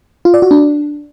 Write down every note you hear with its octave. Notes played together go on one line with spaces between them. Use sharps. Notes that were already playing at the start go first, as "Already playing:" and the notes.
F4
D5
F#4
D4